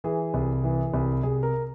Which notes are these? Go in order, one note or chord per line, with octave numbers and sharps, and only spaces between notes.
E3 G#4
C2
E3
C2
C2 G#4
A#4